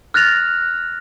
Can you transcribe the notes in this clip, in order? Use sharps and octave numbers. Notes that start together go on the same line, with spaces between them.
F6 F#6 A6 A#6 F7